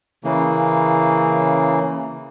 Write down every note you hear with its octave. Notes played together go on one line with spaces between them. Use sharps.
C#3 E3 A#3